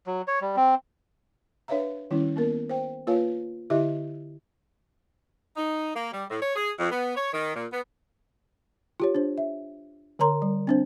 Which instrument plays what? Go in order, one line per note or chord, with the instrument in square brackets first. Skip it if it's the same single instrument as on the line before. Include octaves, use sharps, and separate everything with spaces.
[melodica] F#3
C#5
G3
C4
[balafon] D4 B4 C#5 E5 F5 A#5
D#3 G3 C#4 E4
A#3 B3 A#4
C5 G5
A#3 F4 B4 C#5 F5
D3 E4 G4 D#5 E5
[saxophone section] D#4
A#3
G3
A2
C#5
G#4
F2
B3
C#5
D#3
A#2
B3
[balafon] F4 G4 C#5
D4 C5
E5
D3 A#4 C#5 A#5 C6
G3
C4 D4 C5